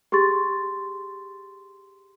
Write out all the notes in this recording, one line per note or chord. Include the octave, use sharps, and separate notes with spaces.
G4 G#4 C6 C#6 A6